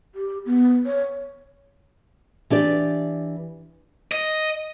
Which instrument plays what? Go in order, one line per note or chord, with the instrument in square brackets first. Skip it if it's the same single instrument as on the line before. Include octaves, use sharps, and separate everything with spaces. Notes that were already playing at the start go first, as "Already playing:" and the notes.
[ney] G4
B3
C#5
[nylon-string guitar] E3 D4 G4 D5
[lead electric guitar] D#5